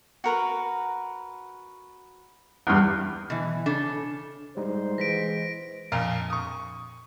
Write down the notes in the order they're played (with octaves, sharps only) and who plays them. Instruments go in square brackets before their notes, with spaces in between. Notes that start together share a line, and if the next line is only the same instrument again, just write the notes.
[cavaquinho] F#4 A#4 B4
[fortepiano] E2 G2
[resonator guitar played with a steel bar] B2 E3
C#3 D4 A4
[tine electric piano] G3 G#3 D#4 [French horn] C5
[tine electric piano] E3 G#3 [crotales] A#6 B6 D7
[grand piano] F2 A#2 F5 A#5
C#6 D#6